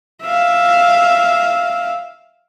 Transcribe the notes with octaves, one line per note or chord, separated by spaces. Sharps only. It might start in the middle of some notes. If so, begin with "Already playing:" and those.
E5 F5